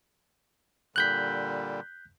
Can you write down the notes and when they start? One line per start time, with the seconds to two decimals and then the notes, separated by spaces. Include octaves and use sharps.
0.96 A#2 D3 G3 F#6 G6 B6